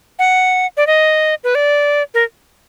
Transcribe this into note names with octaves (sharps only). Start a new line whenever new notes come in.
F#5
D5
D#5
B4
D5
A#4